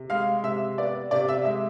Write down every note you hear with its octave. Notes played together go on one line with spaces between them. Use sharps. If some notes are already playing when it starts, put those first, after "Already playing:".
Already playing: C3
G#3 F5
C3 E5
B3 D5
C3 D5
E5
G#3 E5